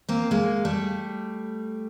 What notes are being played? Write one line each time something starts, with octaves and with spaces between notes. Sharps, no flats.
A#3 C4
G#3 A#3
G3 A3